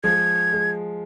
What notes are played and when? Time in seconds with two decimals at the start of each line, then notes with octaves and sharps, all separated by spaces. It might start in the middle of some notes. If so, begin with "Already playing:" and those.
0.04 F3 G#3 G#6
0.53 G#3